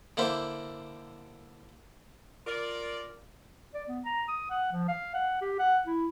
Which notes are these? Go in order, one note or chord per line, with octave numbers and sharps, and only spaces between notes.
D3 A#3 E4 C5
F4 A#4 D5
D5
B3
A#5
D#6
F#5
F3
F5
F#5
G4
F#5
E4